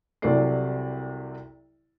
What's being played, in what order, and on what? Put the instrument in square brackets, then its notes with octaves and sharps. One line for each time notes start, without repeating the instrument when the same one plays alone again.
[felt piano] C2 C3 F#3 A4 D5 C7